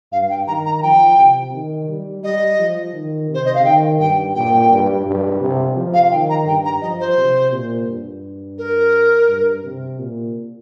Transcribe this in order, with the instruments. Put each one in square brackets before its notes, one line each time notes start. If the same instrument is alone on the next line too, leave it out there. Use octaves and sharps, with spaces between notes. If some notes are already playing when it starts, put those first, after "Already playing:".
[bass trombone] G2 [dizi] F5
[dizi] G5
[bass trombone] D#3 [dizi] A#5
[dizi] A#5
A#5
[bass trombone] F3 [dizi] G5
[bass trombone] C3
D#3
G3
[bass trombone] G3 [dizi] D#5
[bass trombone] F3
D#3
[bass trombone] C3 [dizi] C5
[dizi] D#5
F5
[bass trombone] D#3 [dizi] G5
[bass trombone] G2 [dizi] G5
[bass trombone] A#2 [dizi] G5
[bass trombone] G2
G2
C3
F3
[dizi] F5
[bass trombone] D#3 [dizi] G5
[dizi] A#5
[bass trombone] G2 [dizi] G5
[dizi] A#5
[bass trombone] F3 [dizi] D#5
[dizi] C5
[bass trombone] C3
A#2
G2
[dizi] A#4
[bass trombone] G2
C3
A#2